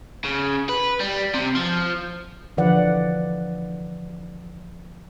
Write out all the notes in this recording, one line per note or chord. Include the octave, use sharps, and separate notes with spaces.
C#3
B4
G3
C3
F3
D3 E3 F3 B4 D5 F#5